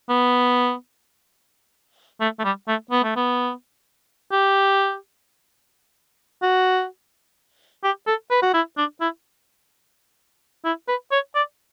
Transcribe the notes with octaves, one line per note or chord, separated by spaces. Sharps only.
B3
A3
A3
G3
A3
B3
A3
B3
G4
F#4
G4
A4
B4
F#4
E4
D4
E4
E4
B4
C#5
D5